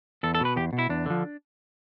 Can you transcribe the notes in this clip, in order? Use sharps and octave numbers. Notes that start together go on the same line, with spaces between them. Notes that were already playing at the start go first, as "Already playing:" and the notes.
E2 A4
A4
B2 B4
E2 G4
B2
E4
E2 D4
D3 F3